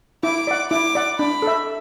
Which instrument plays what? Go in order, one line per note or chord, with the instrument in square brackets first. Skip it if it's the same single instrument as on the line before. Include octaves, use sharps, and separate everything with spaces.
[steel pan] E4 [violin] D6
[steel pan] D5 F#5
[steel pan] E4 [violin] D6
[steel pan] D5 F#5
[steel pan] D4 [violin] B5
[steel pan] A4
E5